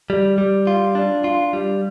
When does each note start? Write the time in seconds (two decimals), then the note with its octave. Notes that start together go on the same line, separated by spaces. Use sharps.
0.10 G3
0.38 G3
0.67 F4
0.95 D4
1.24 F4
1.53 G3